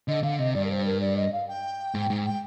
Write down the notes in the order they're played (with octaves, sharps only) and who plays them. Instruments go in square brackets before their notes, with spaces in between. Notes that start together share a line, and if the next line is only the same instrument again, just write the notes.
[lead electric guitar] D3 [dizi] D#5
[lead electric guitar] D3 [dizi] F5
[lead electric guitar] C3 [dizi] D#5
[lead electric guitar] G2 [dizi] D5
[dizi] A#4
C5
A#4
D5
D#5
F5
G5
[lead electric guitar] G#2
G#2
[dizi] G5